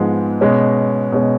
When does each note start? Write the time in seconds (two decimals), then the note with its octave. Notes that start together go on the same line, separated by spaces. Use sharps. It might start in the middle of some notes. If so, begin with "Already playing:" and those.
Already playing: G#2 F3 G#3 B3
0.41 B2 G#3 C#4
1.12 B2 G#3 C#4